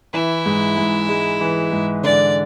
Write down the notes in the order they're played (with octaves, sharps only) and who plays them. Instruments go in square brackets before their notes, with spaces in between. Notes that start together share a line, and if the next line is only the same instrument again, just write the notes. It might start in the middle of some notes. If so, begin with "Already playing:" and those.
[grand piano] E3 [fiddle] E4
[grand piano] G#2
G#2
G#3
E3
G#2
[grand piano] D3 [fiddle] D5